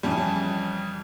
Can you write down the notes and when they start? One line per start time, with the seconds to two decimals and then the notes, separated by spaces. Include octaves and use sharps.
0.03 F2 C#3 E3 G3 A5
0.10 G#5
0.18 A5